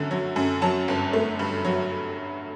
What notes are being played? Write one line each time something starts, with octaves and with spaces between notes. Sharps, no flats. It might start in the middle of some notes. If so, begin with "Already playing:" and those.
Already playing: F#2 D3 A3
F#3
F#2
F#3 A5
G1
A3
G2
F#3